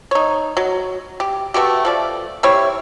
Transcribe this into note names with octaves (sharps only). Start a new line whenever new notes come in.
D#4 C#5
F#3
G4
A3 B3 F#4 G4
F3 A3 D5
G3 C4 E4 C#5